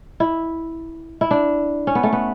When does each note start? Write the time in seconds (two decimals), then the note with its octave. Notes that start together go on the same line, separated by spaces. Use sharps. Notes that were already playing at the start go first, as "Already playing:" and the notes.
0.20 E4
1.21 E4
1.31 D4
1.87 C#4
1.95 B3
2.03 A3
2.13 B3